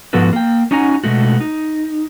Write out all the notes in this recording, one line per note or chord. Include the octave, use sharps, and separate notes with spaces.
G#2 F3 B3 F#4 A4 B4
A#3 G5
C#4 D#4 F#4 F#5 G#5 A#5
B2 G#3 A3 F#4
D#4